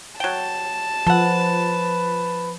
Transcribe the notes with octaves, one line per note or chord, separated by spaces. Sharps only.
F#3 G5 A5
F3 A4 B4 F#5